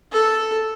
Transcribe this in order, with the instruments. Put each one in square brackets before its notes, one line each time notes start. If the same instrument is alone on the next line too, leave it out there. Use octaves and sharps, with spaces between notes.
[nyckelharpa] A4